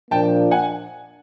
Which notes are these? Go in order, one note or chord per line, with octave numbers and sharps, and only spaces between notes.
A#2 F3 A#3 D4 G5 A5
F#5 G#5